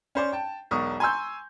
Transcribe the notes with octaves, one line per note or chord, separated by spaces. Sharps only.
C#4 C5 D5
G5 A5
E1 B1 A#4 C#6 D#6
G#5 A#5 C6 C#6 E6 G6